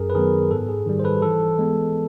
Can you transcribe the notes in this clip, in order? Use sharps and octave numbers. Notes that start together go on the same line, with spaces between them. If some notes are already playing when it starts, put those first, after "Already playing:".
Already playing: F#2 G#4 A#4
B4
D#3 F#3 B3 G#4 A#4
G#2 A4
G#4
D#3 G3
C5
A4 B4
E3 A4
G#3 B3